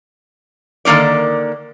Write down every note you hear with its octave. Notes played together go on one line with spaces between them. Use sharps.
D3 D#3 A#3 C#4 D5